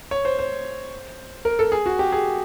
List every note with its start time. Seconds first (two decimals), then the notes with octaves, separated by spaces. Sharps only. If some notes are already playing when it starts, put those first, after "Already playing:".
0.11 C#5
0.25 C5
0.39 C5
1.45 A#4
1.59 A4
1.72 G#4
1.86 F#4
1.99 G4
2.12 G#4